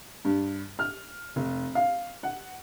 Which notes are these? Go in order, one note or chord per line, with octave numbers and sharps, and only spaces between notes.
G2
F6
F1
F5
F#5